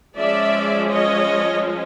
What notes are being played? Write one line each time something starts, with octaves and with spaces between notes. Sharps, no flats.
F3 G#3 C#4 D5 E5
C#5 D#5